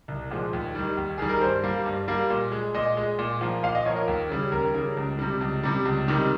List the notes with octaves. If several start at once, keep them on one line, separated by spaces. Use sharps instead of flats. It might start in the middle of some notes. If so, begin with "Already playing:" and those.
C2
A#2 F3 G#3
D#2
D#3 G3
D#2
D#3 G3 G#4
A#4
G2 C5
G3 A#3
G2
G3 A#3
A#2
G#3
A#2 D#5
G#3
A#2
F3 A#3
A#2 F5
D#5
F3 A#3 C#5
A#4
D#2
C#3 G3
D#2 A#4
C#3 G3
C#2
C3 G3
C#2
C3 G3
C#2
C3 D#3 G3